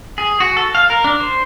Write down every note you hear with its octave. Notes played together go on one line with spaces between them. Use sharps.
G#4
F#4
A4
F5
A#4
D4
C5